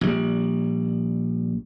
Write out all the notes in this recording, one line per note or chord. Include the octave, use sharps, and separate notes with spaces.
A#1 G3